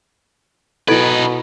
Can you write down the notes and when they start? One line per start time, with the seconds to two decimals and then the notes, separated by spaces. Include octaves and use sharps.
0.88 B2 D#4 E4 A4 B4 D#5 G#6 D7